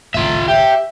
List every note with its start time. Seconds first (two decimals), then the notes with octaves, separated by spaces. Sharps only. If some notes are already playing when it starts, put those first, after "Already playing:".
0.14 G#1 C#2 A2 F4 E5
0.48 G4 E5